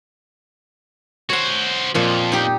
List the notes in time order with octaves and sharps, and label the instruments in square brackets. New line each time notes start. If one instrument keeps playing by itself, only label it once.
[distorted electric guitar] F#4 C5 [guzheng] C#5 F#5
[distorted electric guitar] F2 [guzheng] A#2 F3
[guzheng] D#4 G4